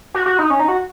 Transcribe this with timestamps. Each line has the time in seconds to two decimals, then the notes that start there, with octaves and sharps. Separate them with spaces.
0.14 F#4
0.26 F#4
0.39 D#4
0.50 C#4
0.59 D#4
0.68 F#4